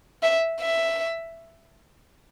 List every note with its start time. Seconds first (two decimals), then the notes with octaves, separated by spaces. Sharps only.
0.23 E5
0.60 E5